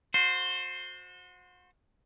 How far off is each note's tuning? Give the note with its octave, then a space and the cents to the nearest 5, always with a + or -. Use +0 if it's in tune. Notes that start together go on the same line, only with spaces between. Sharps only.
F#4 -35 C5 +0